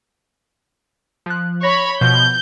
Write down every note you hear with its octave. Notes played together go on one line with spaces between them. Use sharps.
F3 F#6
C#5 B5 A#6
B2 F3 G6